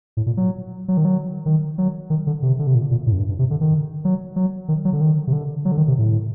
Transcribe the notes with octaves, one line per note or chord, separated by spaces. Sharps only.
A2
A#2
F#3
F#3
D#3
F#3
D#3
F#3
D#3
D3
C3
D3
C3
A#2
A#2
A2
F#2
G2
G2
C3
D3
D#3
F#3
F#3
D#3
F#3
D3
D#3
C3
D3
F#3
D3
D#3
C3
A2